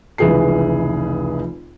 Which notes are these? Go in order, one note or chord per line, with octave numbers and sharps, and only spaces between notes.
F1 C#2 E3 G#4 B4 C7